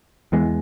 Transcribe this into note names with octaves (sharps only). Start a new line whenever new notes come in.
E2 E3 G#3 B3